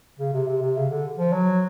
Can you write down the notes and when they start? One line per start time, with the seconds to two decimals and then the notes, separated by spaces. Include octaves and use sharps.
0.19 C#3
0.33 C3
0.47 C3
0.62 C3
0.76 C#3
0.90 D3
1.18 F3
1.32 F#3